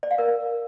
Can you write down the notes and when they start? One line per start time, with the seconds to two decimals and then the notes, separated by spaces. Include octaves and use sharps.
0.03 D5
0.11 F5
0.18 A#4